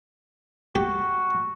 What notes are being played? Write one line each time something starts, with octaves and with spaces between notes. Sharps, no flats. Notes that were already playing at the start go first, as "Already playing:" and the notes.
F#4 G4